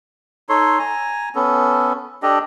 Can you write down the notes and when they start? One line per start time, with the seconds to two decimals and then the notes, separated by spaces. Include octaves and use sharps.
0.49 D#4 A4 C#5 C6
0.79 G#5 A#5
1.35 B3 C#4 A4
2.23 D4 G4 A4 D#5